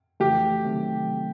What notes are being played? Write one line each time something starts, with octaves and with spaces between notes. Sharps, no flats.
F2 C#3 E3 A3 G4
C3 D#3 F#3 A3 C4